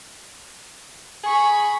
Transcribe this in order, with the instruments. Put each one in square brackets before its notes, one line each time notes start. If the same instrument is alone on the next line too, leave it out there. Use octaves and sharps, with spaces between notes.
[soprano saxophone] G#4 [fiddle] B5 C#6